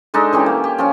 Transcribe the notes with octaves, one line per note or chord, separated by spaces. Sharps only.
G#3 D4 D#4 A4
E3 C#4 G4
A#3
G4
F3 C#4 F5